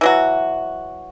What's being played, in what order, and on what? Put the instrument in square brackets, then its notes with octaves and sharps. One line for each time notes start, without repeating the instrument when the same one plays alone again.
[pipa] E3 F#3 F#4